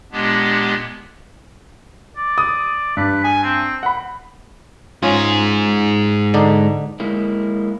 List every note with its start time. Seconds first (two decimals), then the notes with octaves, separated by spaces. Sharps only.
0.12 A#2 G#3 B3 D4 G4
2.17 D5
2.38 D#6
2.97 G2 B4
3.24 G#5
3.43 C4
3.83 F#5 B5
5.03 G#2 C#4 F4 G#4
6.34 D3 D4 D#4
7.00 G#3 A#3 E4